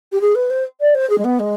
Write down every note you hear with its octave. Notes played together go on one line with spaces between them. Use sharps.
G4
G#4
B4
C5
D5
C5
G#4
G#3
B3
G#3